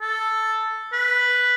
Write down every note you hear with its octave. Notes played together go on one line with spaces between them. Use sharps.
A4
B4